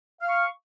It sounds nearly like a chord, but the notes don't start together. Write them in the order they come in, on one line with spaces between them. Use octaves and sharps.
F5 F6 C#6